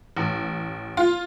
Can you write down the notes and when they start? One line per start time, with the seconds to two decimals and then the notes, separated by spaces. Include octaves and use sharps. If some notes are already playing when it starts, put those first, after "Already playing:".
0.17 A1
0.97 F4